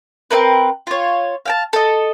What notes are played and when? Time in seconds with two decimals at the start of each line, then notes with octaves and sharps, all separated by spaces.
0.31 C4 D#4 A#4 B4
0.87 F4 C#5
1.46 F5 G5 A5
1.73 A4 D#5